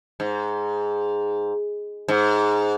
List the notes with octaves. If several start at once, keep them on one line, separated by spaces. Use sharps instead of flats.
G#2
G#2